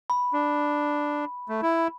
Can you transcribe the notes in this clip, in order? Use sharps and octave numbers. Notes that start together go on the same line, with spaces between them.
B5
D4
A3
E4